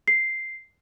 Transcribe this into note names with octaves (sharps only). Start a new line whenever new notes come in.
C7